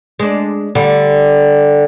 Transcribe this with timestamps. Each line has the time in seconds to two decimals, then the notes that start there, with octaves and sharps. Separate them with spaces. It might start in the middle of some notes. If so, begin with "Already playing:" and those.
0.19 G#3 D4
0.75 D3 G3